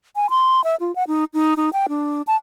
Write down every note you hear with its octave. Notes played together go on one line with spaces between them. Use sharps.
G#5
C6
E5
F4
F#5
D#4
D#4
D#4
G5
D4
A5